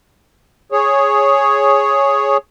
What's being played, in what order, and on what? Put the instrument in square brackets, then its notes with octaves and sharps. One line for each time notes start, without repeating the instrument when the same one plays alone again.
[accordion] G#4 C#5